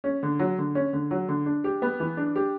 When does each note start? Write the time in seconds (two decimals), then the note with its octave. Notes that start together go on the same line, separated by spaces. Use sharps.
0.04 C#4
0.23 D3
0.39 F#3
0.58 D3
0.75 C#4
0.93 D3
1.11 F#3
1.28 D3
1.46 D4
1.64 G4
1.82 B3
2.00 E3
2.17 D4
2.36 G4